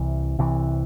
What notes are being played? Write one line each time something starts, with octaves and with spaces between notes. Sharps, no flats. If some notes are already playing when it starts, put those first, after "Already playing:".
Already playing: C2 C3 E3
C2 C3 E3